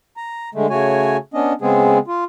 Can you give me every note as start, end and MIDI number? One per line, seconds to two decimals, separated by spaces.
0.17 0.49 82
0.55 0.67 50
0.55 0.67 56
0.55 0.67 57
0.70 1.17 49
0.70 1.17 57
0.70 1.17 66
0.70 1.17 73
0.70 1.17 80
1.34 1.53 59
1.34 1.53 61
1.34 1.53 62
1.34 1.53 75
1.61 1.98 49
1.61 1.98 56
1.61 1.98 59
1.61 1.98 60
1.61 1.98 68
2.08 2.24 65